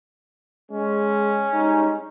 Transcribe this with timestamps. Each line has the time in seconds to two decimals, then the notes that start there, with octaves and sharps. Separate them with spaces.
0.72 G#3 C#4
1.52 G3 G#3 D#4